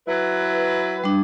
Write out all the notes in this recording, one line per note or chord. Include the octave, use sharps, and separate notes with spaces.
F#3 E4 B4
G3 D4